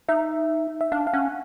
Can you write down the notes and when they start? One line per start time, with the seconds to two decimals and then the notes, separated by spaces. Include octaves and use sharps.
0.09 D#4 E5
0.81 E5
0.92 D4 F5
1.07 F5
1.14 C#4 F#5